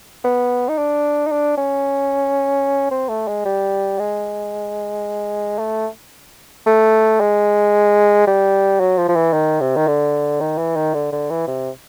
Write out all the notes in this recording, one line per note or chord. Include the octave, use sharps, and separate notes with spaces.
B3
D#4
D4
D#4
D4
C#4
C4
A3
G#3
G3
G#3
A3
A3
G#3
G3
F#3
F3
F3
E3
D#3
C3
D#3
D3
D#3
E3
D#3
D3
D3
E3
C3